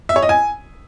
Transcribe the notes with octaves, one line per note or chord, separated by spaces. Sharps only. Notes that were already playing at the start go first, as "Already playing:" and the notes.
E5
C#5
D#5
G#5